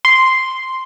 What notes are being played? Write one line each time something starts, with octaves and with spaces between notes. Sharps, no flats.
C6